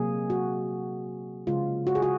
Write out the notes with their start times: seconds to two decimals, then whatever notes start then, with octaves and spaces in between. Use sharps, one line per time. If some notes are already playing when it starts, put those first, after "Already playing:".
Already playing: C3 F#3 A#3 G#4
0.30 F#4
1.47 C#3 G#3 F4
1.87 F#4
1.95 G#4
2.02 F#4